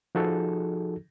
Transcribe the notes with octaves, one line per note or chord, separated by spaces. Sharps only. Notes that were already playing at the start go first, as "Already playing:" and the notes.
F3 D#4 F#4 G#4 A4